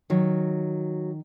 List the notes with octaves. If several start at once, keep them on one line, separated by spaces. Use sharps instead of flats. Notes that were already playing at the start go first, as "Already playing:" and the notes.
D#3 F#3